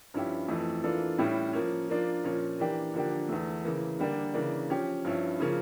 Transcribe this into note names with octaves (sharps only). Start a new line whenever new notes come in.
G2 F3 C#4 E4 G4
F2 E3 A3
E3 A#3 D4 F4 A4
A2 G3 C#4 E4
F3 A#3 C#4
F3 A#3 D4 F4
A#2 F3 C#4
E3 A#3 D4 G4
D3 F3 A#3 D4 G4
E2 E3 A3
C#3 E3 A#3
D3 G3 A#3 D4
C#3 E3 A#3 D4
F3 C#4 G4
G2 F3 C#4 E4
C#3 F3 A#3 C#4